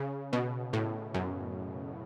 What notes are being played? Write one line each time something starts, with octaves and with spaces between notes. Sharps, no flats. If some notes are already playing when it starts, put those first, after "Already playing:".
Already playing: C#3
B2
A2
F#2